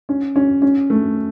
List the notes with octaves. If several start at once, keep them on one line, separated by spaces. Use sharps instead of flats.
C#4
C#4
C#4
A3